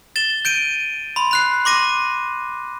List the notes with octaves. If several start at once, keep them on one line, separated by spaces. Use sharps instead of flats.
A6 E7 G7
G6 D7 D#7
B5 C6
B5 F#6 C7
C6 D6 A#6 D#7